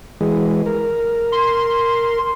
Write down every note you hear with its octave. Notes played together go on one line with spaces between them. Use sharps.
E3 G#3
A#4
C6